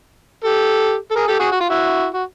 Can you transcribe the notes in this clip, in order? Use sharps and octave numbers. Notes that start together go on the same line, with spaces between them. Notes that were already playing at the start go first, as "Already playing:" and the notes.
G4 A4
A4
G#4 A#4
G4 A4
F#4 G#4
F#4
F4
E4 F#4
F#4